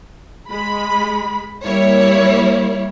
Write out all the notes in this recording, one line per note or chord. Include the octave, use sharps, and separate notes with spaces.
G#3 B5
G3 A#3 E4 C#5